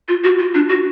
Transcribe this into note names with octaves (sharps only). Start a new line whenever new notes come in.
F4
F#4
F4
D4
F#4